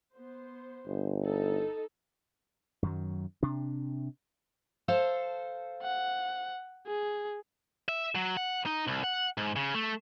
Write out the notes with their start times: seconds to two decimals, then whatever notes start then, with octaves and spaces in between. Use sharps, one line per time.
0.14 B3 C5
0.87 G1
1.23 D#4 A4
2.83 F#2 D#3 F#3
3.43 C3 D4
4.88 A4 C5 F5
5.83 F#5
6.87 G#4
7.89 E5
8.15 F#3
8.37 F#5
8.66 D#4
8.87 C2
9.04 F#5
9.38 G#2
9.56 C#3
9.74 A3